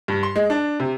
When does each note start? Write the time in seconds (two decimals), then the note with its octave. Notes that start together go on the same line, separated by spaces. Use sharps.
0.08 G2
0.23 C6
0.36 G#3
0.50 D4
0.80 C3